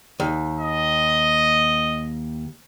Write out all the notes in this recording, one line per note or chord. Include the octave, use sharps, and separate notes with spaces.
D#2
D#5